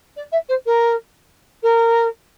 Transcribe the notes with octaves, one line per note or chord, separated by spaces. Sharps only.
D5
E5
C5
A#4
A#4